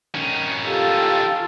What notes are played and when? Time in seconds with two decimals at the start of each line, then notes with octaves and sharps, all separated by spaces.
0.15 D#3 C#4
0.67 F4 G4 A4